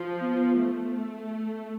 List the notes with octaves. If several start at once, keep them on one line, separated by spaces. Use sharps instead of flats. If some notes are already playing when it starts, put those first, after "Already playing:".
Already playing: F3
B3
A3